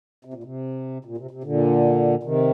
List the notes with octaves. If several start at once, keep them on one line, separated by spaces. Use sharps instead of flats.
C3
A#2
C3
A#2
C3
C3
A#2 D3
C3 D#3